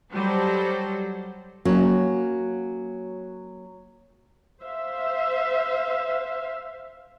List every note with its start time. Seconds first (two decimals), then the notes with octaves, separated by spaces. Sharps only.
0.14 F#3 G3 A4 C5
1.65 F#3 A#3 C#4 F#4
4.62 C5 E5 F5